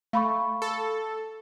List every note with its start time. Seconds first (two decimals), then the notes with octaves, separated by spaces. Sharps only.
0.13 A3 F5 B5 C#6
0.62 A4